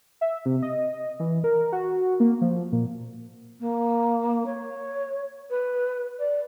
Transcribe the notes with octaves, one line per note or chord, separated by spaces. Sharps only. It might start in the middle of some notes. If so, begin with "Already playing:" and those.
E5
C3
D#5
E3
A#4
F#4
A#3
F3
A#2
A#3
C#5
B4
D5